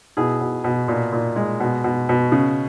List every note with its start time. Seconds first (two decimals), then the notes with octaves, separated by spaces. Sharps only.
0.17 B2 E4 G#4
0.41 B2
0.64 B2
0.88 A#2
1.12 A#2
1.36 G#3
1.60 B2
1.84 B2
2.09 B2
2.32 C#3